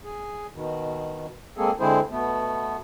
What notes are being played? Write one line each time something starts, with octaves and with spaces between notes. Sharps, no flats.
G#4
B2 D#3
G#3 A#3 C4 G#4 A4
D3 G#3 C4 E4 G#4 C5
B2 A3 B3